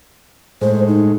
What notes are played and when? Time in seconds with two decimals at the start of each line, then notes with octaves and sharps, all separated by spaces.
0.61 A2 G#3 C5
0.88 D#4